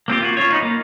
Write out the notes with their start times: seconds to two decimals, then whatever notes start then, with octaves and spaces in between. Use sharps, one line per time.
0.08 A#3 C4 F4 G4
0.21 A#3 F4 F#4
0.37 C#4 E4 F4 C#5
0.50 B3 D#4 F4
0.62 A#3